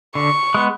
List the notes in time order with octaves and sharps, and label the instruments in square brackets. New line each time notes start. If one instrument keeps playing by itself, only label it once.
[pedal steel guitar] D3 [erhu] C#6
[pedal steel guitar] G#3 B3